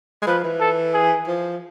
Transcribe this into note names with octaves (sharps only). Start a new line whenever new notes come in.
G#3
F3 B4
E3
A4
G#4
F3